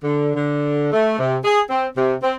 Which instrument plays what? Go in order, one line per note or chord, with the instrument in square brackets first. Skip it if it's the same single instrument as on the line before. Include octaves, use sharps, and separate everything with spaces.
[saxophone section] D3
D3
A3
C3
G#4
C4
C3
C4